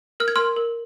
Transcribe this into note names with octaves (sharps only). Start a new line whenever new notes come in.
A#4 F6
G#6
A#4 C6 F6
A#4